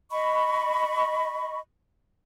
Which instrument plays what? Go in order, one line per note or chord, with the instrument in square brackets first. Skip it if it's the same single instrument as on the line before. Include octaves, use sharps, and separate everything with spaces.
[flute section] D#5 B5 C#6